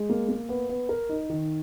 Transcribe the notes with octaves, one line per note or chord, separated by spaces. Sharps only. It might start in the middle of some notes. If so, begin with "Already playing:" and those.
Already playing: G#3
A#3
A#3
B3
B3
A#4
D#4
D#3